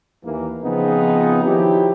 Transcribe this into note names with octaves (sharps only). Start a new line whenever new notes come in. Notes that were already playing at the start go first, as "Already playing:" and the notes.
D#2 E3 A#3
C#3 F3 B3 C4 D#4 G#4
D#3 F3 F#3 E4 G4